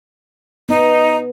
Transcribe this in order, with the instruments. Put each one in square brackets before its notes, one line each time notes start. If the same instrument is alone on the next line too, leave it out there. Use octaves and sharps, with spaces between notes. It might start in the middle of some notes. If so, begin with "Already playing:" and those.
[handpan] B3 [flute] D#4